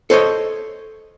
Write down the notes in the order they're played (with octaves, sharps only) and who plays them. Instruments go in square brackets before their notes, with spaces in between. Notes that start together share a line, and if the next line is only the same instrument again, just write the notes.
[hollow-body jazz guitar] A4 C5 C#5 D#5